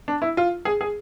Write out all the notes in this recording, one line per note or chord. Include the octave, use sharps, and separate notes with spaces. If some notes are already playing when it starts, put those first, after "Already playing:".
D4
E4
F4
G#4
G#4